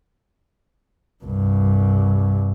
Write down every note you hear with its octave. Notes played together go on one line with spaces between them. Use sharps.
C2 G2